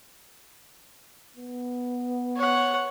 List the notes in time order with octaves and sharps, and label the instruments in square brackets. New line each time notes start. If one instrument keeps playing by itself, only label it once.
[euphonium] B3
[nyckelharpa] C#5 F#5